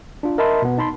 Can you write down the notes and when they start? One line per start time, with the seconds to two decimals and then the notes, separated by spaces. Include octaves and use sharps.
0.23 D4 F4
0.38 A#4 D#5 E5 A5 B5 C6
0.62 B2 B3
0.78 D#4 A5 B5 C6